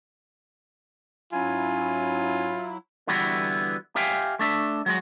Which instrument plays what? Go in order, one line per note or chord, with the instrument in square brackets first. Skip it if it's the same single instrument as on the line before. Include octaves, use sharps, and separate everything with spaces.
[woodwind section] G#2 C#4 G#5 [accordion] F#3 E4 [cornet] F4
[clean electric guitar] D3 E3 G3 B3 E4 F#4
G4 E5 F5 G5 G#5
A3 D4 E5
F#3 G#3 F#4